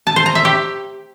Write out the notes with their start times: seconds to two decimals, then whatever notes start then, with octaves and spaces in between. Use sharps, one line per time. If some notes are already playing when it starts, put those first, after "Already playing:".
0.07 A5
0.16 C5
0.26 A#5
0.35 E5
0.45 G4